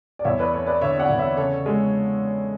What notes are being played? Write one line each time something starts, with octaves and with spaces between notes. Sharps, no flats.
D5
E2 C#5 E5
B4 D5
A3 A4 C#5
B4 D5
D3 C#5 E5
D5 F#5
E2
C#5 E5
C#3 A4 C#5
G#3